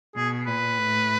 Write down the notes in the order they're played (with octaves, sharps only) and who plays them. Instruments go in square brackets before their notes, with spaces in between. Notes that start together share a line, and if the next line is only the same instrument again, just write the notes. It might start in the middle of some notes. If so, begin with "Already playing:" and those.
[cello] B2 [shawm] G#4
[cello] A#2 [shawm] B4
[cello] A2